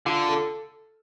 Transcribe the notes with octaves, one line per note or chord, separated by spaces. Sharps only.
D3 F4
A4